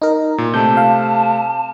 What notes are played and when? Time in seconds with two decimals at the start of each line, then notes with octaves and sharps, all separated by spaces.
0.02 D#4 A#4
0.38 A#2
0.54 C3 A3 C4 A5 G6
0.77 F5